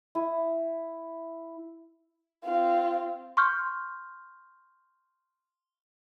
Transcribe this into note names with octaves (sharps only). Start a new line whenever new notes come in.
E4 D#6
C4 F4
C6 C#6 F6 G6